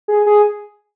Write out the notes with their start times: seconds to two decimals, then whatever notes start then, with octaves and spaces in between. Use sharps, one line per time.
0.08 G#4
0.26 G#4